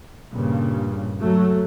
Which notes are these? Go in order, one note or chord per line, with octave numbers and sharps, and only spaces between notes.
G2 A#2 C#3
F#3 A3